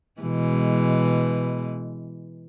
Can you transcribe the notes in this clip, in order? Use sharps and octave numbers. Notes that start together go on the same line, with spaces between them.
B2 E3 G#3